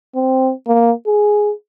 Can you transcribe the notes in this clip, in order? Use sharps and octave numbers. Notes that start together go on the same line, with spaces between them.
C4
A#3
G#4